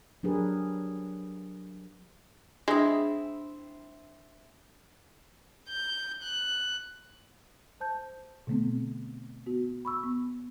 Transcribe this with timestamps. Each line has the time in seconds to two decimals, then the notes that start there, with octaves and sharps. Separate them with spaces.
0.23 F#3 D4 G4 G#4 A#4 B4
2.68 G#3 C4 D4 E4 D6 D#6
5.68 G6
6.23 F#6
7.80 C5 A5 G6
8.47 B2 D3 A3 B3 C4
9.46 B3 F#4
9.85 B5 C#6 E6
10.04 B3